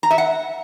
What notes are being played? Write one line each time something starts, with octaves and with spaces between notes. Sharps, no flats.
A#5
E5
F#5